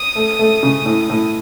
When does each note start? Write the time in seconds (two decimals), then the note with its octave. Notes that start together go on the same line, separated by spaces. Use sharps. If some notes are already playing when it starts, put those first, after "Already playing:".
Already playing: D#6
0.15 A3
0.39 A3
0.63 C#3
0.86 A2
1.10 A2